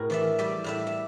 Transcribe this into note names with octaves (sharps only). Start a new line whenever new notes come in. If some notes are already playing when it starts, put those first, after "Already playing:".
Already playing: A2 F#4 G#4 A#4
E3 D5 E5
G3 D5 E5
A2 D5 E5
E5